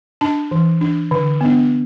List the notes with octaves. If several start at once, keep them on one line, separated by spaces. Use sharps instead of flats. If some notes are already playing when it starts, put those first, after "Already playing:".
D4 A5
E3
D4
D3
B3 D4